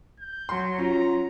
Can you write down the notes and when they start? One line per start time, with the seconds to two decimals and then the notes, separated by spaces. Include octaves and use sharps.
0.20 G6
0.49 F#3 C6
0.79 C#4 F4 A#5